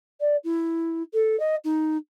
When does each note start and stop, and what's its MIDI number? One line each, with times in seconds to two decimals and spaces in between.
0.20 0.36 74
0.44 1.02 64
1.13 1.38 69
1.40 1.56 75
1.64 1.97 63